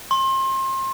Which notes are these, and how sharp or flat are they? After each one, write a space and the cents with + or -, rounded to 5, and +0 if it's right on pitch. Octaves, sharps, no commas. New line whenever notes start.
C6 +30